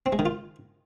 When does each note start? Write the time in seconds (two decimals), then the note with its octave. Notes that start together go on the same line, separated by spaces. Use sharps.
0.06 C4
0.12 G#3
0.19 D#3
0.26 F4